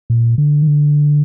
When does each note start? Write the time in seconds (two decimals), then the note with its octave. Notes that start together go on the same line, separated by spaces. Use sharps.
0.10 A#2
0.38 D3
0.62 D#3
0.67 D3